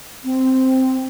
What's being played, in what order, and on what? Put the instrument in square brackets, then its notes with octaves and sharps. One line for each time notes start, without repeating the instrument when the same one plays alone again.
[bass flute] C4